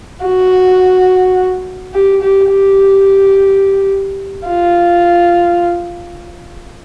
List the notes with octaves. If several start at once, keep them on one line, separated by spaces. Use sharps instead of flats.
F#4
G4
G4
G4
F4